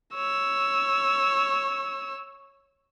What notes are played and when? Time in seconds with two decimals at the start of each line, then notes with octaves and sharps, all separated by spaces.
0.15 C#5 E6